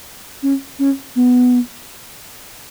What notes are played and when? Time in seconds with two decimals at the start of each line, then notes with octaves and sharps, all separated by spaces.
0.43 C#4
0.79 C#4
1.16 B3